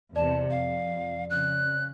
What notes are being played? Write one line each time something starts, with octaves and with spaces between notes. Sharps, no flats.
E2 C3 D5 A5
F2 F5
C#3 F#6